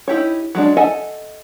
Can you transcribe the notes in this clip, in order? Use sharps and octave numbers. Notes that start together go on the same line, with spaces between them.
D#4 E4 G4 C#5
F#3 G#3 D4
A4 D#5 E5 F#5 G#5